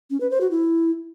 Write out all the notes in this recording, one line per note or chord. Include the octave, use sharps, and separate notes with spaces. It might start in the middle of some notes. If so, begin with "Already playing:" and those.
C#4
B4
C5
F#4
E4